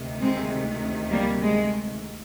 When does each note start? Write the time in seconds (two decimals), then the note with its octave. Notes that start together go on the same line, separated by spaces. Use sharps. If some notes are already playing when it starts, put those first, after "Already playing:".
Already playing: D2 C3 D#3
0.21 G#3 C4
1.10 G3 A#3
1.41 G#3